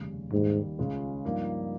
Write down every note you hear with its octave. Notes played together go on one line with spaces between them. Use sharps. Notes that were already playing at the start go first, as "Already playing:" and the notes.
Already playing: F1 D#2 C#3 G3 C#4
D#2 G#2 D#3 G3
C#2 C#3 G#3 C#4 F4
G2 F3 A#3 D#4